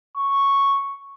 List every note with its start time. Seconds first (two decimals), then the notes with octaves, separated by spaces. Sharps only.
0.17 C#6